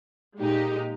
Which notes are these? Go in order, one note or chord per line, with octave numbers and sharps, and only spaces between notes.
A#2 G#3 D#4 G4